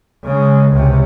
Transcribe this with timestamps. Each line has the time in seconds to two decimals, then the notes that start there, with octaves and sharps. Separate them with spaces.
0.23 C#3 G#3
0.72 C#2 C3